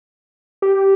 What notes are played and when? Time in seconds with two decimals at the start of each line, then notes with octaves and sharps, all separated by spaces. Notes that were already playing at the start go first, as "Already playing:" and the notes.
0.62 G4